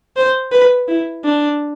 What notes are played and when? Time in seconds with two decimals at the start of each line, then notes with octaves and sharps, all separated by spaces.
0.16 C5
0.52 B4
0.88 E4
1.24 D4